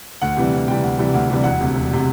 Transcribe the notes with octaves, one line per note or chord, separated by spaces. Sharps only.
D2 F#5
C3 E3 G3
D2
C3 E3 G3 G5
D2
C3 E3 G3
D2
C3 E3 G3
E1 F#5
D2 C3
E1
C3